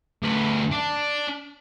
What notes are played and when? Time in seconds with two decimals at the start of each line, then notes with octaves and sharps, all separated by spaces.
0.23 D2 B4
0.72 D4